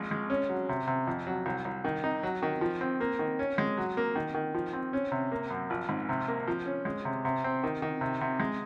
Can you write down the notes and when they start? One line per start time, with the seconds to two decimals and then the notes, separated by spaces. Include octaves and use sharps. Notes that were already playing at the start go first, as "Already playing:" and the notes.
Already playing: A#1 G#3
0.11 G#3
0.30 C#4
0.49 F#3
0.69 C3
0.87 C3
1.07 F2
1.27 F#3
1.46 C2
1.65 C2
1.84 D#3
2.04 D#4
2.23 F#3
2.42 D#3
2.61 F3
2.81 C4
3.00 A#3
3.19 D#3
3.39 C#4
3.58 G#3
3.77 F#3
3.97 A#3
4.16 D#3
4.34 D#3
4.54 F3
4.73 C4
4.93 C#4
5.12 C3
5.32 A#3
5.50 F#2
5.70 A#1
5.89 G#2
6.09 C3
6.28 A#3
6.47 F3
6.66 C#4
6.85 G#3
7.05 C3
7.25 C3
7.44 C4
7.64 D#3
7.82 D#3
8.01 C3
8.21 C3
8.40 G#3